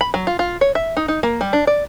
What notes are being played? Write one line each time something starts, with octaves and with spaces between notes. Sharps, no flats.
B5
F#3
F4
F4
C#5
E5
D#4
D#4
A#3
G3
D4
D5